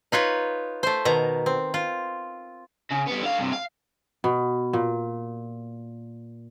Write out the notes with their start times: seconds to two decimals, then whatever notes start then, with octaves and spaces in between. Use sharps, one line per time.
0.12 D#4 F4 B4 C#5
0.83 A3 C5
1.05 B2 D#3 A#5
1.46 C4
1.74 F4
2.91 C#3
3.07 G3 B3
3.21 D3 F5
3.38 G2 C3
3.52 F5
4.24 B2
4.73 A#2